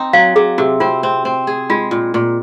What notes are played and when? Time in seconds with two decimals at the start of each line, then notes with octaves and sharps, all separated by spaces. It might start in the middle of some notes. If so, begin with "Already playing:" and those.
Already playing: C4 D#4
0.13 F#3 F5
0.36 F#3 G#4
0.58 C3 F#4
0.80 C4 F4
1.03 C4
1.25 C4
1.47 G#4
1.70 G#3 F4
1.91 A#2
2.14 A#2